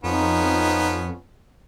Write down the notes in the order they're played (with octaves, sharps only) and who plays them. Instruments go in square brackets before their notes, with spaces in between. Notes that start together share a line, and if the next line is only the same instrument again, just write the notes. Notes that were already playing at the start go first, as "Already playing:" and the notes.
[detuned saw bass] F2 [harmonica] F3 B3 C#4 [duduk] D#4